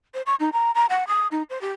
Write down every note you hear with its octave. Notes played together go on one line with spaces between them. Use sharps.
C5
C#6
D#4
A#5
A#5
F#5
D#6
D#4
C5
G4